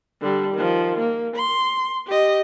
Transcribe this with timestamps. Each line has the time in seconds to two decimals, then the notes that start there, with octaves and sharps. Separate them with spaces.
0.21 D3 G3
0.53 D#3 F3
0.99 A#3
1.36 C6
2.07 G4 D#5